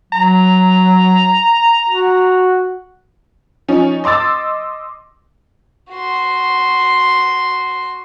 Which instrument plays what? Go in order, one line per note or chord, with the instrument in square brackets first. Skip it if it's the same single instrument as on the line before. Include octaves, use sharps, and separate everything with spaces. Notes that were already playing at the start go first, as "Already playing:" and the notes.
[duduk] F#3 [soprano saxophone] A#5
[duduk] F#4
[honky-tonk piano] F3 C#4 D#4
D#5 C6 D6 E6 A6
[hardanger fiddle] F#4 C6